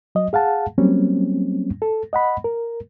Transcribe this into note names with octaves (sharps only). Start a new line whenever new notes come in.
F#3 D#5
G#4 F5 F#5 A5
F#3 G3 A#3 C4 C#4
A4
D#5 F#5 B5
A#4